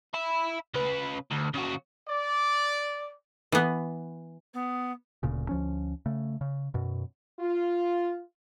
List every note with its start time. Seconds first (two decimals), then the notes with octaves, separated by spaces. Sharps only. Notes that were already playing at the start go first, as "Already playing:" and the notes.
0.14 E5 B5
0.74 C#3 B4
1.31 D2
1.54 C#3 F#4
2.07 D5
3.52 E3 B3
4.53 B3
5.23 D1 D2 A#2 C#3
5.49 D2 F3 C#4
6.06 C#3 A3
6.41 C#3
6.74 F#2 B2
7.40 F4